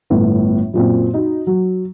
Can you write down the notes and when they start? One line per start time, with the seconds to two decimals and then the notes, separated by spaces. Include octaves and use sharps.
0.10 G1 A2 B3
0.73 F#2 A#2 C4
1.13 D#4 F#4
1.47 F#3